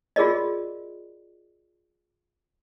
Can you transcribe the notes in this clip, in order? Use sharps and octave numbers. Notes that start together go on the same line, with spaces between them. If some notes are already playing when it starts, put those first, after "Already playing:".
F4 F#4 G#4 A#4 D5 D#5